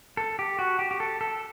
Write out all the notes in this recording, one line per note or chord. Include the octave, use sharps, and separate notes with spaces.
A4
G4
F#4
G4
G4
A4
A4